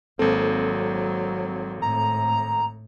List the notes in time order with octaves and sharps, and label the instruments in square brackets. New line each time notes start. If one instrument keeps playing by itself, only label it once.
[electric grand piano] G#1 A#3 C4 [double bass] F#3 [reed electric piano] A4
[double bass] A2 [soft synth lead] A#5